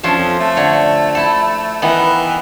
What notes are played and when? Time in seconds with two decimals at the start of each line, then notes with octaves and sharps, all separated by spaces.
0.03 F3 C#4 D4 E5
0.18 F2
0.40 A3
0.57 D3 C#5
1.15 E4 A4
1.82 D#3 E3 B3